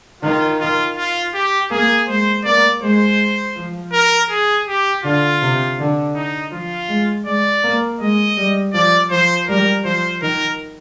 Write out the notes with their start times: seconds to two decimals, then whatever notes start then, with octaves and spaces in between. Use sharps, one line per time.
0.22 D#3 F4
0.60 F4
0.97 F4
1.34 G4
1.70 A#3 G#4
2.08 G#3 C5
2.45 A#3 D5
2.82 G#3 C5
3.56 F3
3.93 A#4
4.30 G#4
4.67 G4
5.03 D3 F4
5.41 C3
5.78 D3
6.15 D#4
6.52 F3 F4
6.89 G#3
7.26 G#3 D5
7.63 A#3
8.00 G#3 D#5
8.37 G3
8.73 F3 D5
9.11 F3 C5
9.47 G3 A#4
9.84 F3 C5
10.22 D#3 A#4